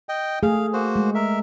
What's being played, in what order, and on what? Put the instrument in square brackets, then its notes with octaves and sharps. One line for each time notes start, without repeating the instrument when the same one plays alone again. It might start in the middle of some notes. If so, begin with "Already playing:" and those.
[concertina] D#5 G5
[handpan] A3 G#4 [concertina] F5
[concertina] A#3 F#4 C5
[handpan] G#3
[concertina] A#4 E5